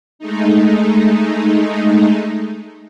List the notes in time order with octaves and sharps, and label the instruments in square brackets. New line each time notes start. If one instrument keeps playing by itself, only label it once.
[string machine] G#3 A3 D#4